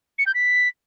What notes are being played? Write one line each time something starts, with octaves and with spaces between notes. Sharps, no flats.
C#7
G6
B6